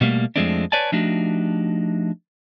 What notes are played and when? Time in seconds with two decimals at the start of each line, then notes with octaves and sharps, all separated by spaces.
0.01 B2 G3 A3 A#3
0.36 F2 F3 G#3 A3 C4 D4
0.72 B4 C#5 D5 G#5 A5
0.92 F3 A3 D4 D#4 F#4 G4